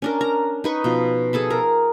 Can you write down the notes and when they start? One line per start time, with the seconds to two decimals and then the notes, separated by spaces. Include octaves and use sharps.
0.02 C#4 D4 A#4
0.21 A#5
0.64 D#4 B4 C#6
0.84 B2 F3
1.33 G#4 A4 A5 B5
1.50 A#4 A#5